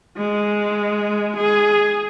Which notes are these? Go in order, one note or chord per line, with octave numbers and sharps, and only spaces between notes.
G#3
G#4